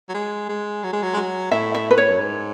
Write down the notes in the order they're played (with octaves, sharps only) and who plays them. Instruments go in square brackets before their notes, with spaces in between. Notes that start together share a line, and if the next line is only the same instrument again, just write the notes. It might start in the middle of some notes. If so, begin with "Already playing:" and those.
[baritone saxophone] F#3
G#3
G#3
F#3
G#3
F#3
G#3
F#3
[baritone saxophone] A2 [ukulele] E5
[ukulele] E5
B4
C#5
[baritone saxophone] F#2
G#2